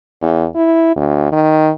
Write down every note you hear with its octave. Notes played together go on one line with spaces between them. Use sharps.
E2
E4
D2
D#3